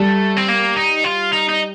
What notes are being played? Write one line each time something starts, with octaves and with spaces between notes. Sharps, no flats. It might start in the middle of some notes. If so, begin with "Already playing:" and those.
Already playing: G3 A3
C4
A#3
D#4
F4
D#4
D#4